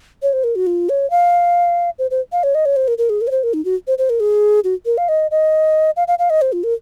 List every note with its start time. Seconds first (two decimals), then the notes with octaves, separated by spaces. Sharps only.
0.23 C#5
0.33 C5
0.44 A#4
0.56 F#4
0.67 F4
0.89 C#5
1.10 F5
1.99 C5
2.11 C5
2.32 F5
2.43 C#5
2.55 D#5
2.66 C#5
2.76 C5
2.88 A#4
2.98 A#4
3.10 G#4
3.21 A#4
3.27 C#5
3.31 C5
3.43 A#4
3.54 D#4
3.65 F#4
3.87 C5
3.98 C5
4.10 A#4
4.20 G#4
4.64 F#4
4.86 A#4
4.98 F5
5.09 D#5
5.31 D#5
5.97 F5
6.08 F5
6.19 F5
6.30 D#5
6.42 C5
6.53 F4
6.64 A#4